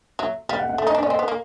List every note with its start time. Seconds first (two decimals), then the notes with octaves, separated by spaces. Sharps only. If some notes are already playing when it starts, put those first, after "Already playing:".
0.19 F#3 E5
0.49 G3 F5
0.59 F#5
0.69 F#5
0.78 A3 E5
0.87 D#4 D#5
0.95 D4
0.98 D5
1.03 C#4
1.09 C4 D#5
1.19 B3
1.28 A#3